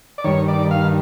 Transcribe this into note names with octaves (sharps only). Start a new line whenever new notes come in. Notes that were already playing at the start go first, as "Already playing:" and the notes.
D5
G2 D#3 C#5
D5
F5